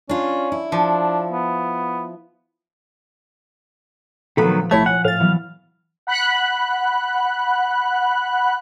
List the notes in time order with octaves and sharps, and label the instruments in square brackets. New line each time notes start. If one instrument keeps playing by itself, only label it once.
[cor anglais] C#4 [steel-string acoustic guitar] D4 F4
[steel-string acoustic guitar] E4
[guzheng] F3 [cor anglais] D4
[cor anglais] B3
[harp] A#2 F3 [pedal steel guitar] D#3 F#3 B3 [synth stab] A3 B5
[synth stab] C2 C#5 G#6 [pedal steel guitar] A3 E4
[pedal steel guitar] F#5 [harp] G#5
[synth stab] A2 A6 [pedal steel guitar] F5
[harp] E3 F#3 B3
[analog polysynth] F#5 B5 F#6